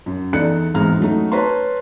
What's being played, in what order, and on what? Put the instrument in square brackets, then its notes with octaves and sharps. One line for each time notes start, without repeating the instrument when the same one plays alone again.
[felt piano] F#2
E2 D#4 A4 D5 F#6 C#7
G#1 E2 G#3 A#5 F6
F#3 A3 D#4
B4 C#5 A5 A#5 C6